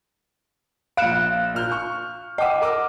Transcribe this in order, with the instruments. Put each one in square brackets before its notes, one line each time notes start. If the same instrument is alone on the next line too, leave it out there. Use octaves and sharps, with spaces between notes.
[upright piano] A#1 F6 C#7 [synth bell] F5 F#6 E7
[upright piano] A#2 F6 G6
C#6
[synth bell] D#5 F#5 [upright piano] G5 D6 E6
[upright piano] A#4 D6 E6